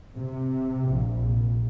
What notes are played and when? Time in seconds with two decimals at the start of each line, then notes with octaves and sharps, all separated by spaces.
0.16 C3
0.89 A#1